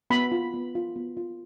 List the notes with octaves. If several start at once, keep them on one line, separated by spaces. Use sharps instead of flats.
B3 B5
F4
B3
F4
B3
F4